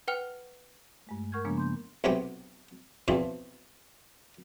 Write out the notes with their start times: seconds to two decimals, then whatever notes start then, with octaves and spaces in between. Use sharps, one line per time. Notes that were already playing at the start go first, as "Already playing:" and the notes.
0.08 B4 F#5 G5 F6 F7
1.07 G2 G#3 A3
1.32 A#4 F#5 C#6 F6 G6 G#6
1.45 C#3 F3 G#3 A#3 B3 D4
1.57 C6 G6
2.04 B1 C3 B3 G4 G5
3.08 E2 B2 E3 F3 C4